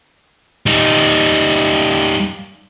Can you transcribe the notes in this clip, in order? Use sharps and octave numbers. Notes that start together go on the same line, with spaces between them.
G3 D#4